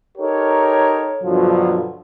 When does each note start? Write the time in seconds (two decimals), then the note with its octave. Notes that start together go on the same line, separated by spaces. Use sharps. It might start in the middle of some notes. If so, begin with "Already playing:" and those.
0.18 D#4 G4 A4 A#4 C#5
1.23 G2 B2 D3 F3 F#3